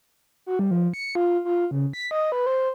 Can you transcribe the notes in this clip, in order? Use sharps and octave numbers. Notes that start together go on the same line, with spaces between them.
F#4
G3
F3
C#7
F4
F4
C#3
B6
D#5
B4
C5